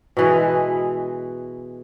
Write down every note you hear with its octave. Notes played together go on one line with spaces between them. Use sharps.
B2 E3 G#3